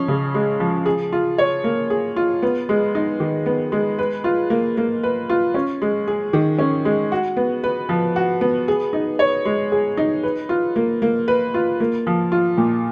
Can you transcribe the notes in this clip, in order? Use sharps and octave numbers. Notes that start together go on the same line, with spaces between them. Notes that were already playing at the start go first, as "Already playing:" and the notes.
Already playing: F3 C#4
C#3
G#3
F3
G#4
F4
C#5
A#3
G#4
F4
B3
G#3
D#4
D#3
B3
G#3
B4
F4
A#3
A#3
B4
F4
C#4
G#3
G#4
D#3
C#4
G#3
F#4
B3
B4
F3
F#4
B3
G#4
D#4
C#5
G#3
G#4
D#4
B4
F4
A#3
A#3
B4
F4
A#3
F3
F4
A#2